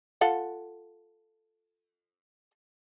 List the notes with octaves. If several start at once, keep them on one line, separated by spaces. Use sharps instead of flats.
F4 A4 F#5